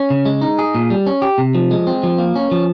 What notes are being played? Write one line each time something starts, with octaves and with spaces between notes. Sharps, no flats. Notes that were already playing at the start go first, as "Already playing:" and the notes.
Already playing: C#4
C#3
G#3
D#4
G#4
A#2
G3
C#4
G4
C3
F3
G#3
C4
F3
A#3
C#4
F3